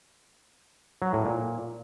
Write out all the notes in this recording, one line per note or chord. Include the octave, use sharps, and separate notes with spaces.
F#3
A2
A#2